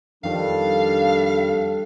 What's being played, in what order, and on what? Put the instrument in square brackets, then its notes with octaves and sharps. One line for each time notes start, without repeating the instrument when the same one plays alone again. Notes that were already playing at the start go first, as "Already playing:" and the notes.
[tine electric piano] F2 D#3 F3 [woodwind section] G3 D4 [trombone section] A4 [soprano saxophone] F5